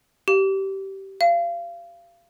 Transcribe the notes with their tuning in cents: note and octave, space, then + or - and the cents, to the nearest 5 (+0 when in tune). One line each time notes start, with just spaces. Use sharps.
G4 -20
F5 -30